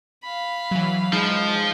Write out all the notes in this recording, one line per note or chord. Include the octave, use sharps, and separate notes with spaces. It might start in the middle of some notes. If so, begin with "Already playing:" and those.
F5 B5
E3 F#3
F3 G#3 D#4